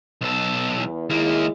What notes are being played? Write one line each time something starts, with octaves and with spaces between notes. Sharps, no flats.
B1 A4
E2
D#2 G#3 A#3 E4